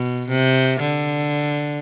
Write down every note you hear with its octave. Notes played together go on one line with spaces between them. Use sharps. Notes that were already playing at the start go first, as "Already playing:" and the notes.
Already playing: B2
C3
D3